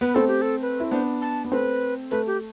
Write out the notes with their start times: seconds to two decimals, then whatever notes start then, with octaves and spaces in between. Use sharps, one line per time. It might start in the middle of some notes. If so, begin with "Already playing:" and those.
0.01 B3 B4
0.15 A3 C4 A4
0.28 G4
0.42 A4
0.62 B4
0.80 E4
0.91 B3 D4 C5
1.22 A5
1.45 B3
1.52 A3 C4 B4
2.11 A3 B4
2.27 G4